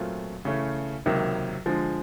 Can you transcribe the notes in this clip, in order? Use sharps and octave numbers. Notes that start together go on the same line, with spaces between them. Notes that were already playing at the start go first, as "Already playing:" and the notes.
Already playing: A#2 F#3 A3 C4 F4
C#3 E3 A3 C#4
C#2 C3 D#3 F#3 A#3
D3 F3 G#3